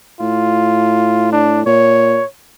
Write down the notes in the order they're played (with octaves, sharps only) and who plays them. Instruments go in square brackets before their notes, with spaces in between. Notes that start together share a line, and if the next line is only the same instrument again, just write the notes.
[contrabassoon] A2 [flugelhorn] F4
[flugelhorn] D4
[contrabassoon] A#2 [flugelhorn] C#5